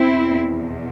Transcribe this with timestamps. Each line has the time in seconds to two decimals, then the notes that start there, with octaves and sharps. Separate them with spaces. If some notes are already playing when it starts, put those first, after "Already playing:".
Already playing: E2 B2 C4 E4